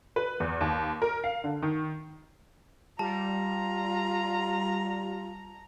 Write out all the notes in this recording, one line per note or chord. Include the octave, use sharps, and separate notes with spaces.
B4
E2
D#2
A#4
F5
D3
D#3
G3 F4 A5 A#5